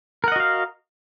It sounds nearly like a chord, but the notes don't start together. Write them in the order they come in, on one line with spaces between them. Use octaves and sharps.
A#4 F#5 D#5 F#4 F5